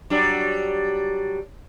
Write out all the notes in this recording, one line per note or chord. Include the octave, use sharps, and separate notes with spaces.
F#3 G3 D4